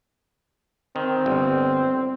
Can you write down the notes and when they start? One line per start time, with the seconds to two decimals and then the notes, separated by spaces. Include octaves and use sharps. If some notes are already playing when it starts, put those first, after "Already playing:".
0.96 D#3 C4
1.26 G1